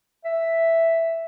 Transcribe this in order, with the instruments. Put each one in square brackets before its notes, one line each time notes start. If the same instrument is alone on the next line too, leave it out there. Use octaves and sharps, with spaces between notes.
[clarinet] E5